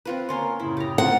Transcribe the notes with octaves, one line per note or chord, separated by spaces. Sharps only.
C4 F4 B4
A#3 C#4 A#4 C#5 C6
F#2 A2 C#3 E4
G4 A#5
A#3 C4 F4 F#5